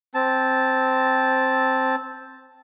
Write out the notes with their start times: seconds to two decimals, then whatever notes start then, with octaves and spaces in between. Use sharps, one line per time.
0.14 C4 A5